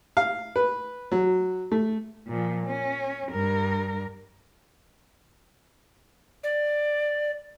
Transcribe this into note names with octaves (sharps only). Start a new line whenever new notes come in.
F5
B4
F#3
A3
A#2 F3
C#4
G2 A#4
D5